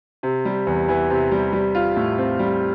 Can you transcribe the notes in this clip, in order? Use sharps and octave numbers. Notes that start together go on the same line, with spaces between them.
C3
G3
E2
E3
C3
G3
G3
F4
A2
C4
G3